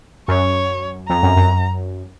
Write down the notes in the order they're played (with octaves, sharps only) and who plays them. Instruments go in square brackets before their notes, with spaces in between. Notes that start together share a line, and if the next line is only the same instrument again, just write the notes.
[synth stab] F#2 [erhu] C#5
[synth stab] F2 [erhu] A#5
[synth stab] F#2
F#2